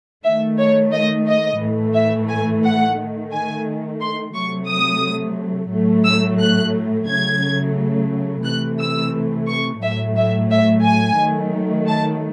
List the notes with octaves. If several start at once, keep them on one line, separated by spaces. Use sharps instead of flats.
D#3 A3 E5
C#5
D#5
D#5
A2 E3 A3
E5
G#5
F#5
D#3 A3
G#5
C6
C3 F#3 A3 C#6
D#6
A2 F#3 A3
E6
F#6
C#3 F#3 A3 G#6
C3 E3 A3 F#6
E6
C#6
A2 F#3 A3 E5
E5
E5
G#5
D#3 F#3 A3
A5